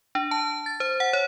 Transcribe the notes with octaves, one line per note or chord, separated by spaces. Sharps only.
D4
A5
A6
C5
F#5
C#5